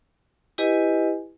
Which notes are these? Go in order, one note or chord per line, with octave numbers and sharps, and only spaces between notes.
E4 G4 B4 D#5 G#5